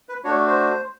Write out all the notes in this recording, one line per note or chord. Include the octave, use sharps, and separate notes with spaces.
B4
A3 D4 F#4 C#5
C5